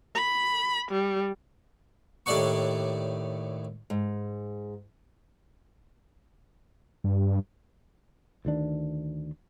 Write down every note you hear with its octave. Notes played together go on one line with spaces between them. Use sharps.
B5
G3
D#2 A2 D4 D5 F#5 C#6
G#2
G2
D2 D#3 D4